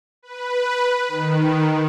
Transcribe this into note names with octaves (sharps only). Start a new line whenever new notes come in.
B4
D#3